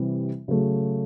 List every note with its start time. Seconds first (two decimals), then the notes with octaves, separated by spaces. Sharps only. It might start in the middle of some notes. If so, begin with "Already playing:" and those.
Already playing: C3 E3 G3
0.48 C#3 F#3 A3